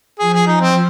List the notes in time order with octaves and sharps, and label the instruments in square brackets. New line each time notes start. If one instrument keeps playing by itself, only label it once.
[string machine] F3 [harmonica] G#4
[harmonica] G#4
D#4
C4